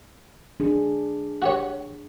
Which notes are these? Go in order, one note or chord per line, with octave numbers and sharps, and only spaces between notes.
D4 G#4
F#4 G4 C#5